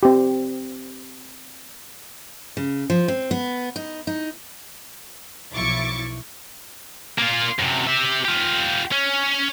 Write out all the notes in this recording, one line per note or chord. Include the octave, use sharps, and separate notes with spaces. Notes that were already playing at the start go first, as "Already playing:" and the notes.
C4 G4
C#3
F3
C4
B3
D#4
D#4
B1 F3 E4 C#6 D6 A6
A#3 F4
F#2 C3
G4 E5
F4 G4
C#4